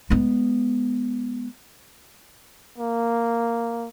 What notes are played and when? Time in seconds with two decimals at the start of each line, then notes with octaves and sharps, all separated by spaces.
0.10 G#3 B3
2.78 A#3